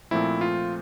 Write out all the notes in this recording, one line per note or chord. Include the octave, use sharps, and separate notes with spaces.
A#2 F3 A3 C4 E4
F4